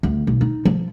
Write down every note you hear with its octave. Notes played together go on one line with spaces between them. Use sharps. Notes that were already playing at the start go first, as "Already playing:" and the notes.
D2
B1
D#4
F3